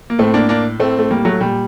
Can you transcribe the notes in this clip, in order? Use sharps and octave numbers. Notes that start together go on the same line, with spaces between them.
A#3
A2 A3 C4
A#3 D4
A#3 D4
A2 A3 C4
A3
G3 A#3
F#3 A3
A#2 G3